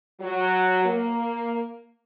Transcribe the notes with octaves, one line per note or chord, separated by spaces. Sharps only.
F#3
A#3